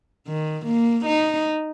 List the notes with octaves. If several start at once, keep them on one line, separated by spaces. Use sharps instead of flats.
D#3
A#3
D#4